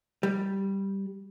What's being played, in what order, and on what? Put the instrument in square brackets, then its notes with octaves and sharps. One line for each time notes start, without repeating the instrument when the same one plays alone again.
[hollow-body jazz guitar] G3